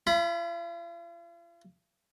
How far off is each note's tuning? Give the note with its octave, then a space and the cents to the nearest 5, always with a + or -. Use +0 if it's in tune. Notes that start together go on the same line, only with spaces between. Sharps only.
F4 -45 B5 +5